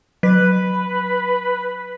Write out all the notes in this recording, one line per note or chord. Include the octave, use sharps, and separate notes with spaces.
F#3 B4